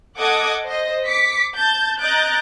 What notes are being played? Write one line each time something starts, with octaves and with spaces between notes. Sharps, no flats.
A4 D#5 F#5 D6 D#6 G#6
C5 D#5
D6 B6 C#7
A5 G6 A6
D#5 A#5 F#6 G6 A6 D7